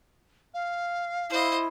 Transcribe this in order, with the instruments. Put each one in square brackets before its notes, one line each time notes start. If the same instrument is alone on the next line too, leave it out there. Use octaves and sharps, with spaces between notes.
[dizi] F5
[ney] E4 [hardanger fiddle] C5 D#5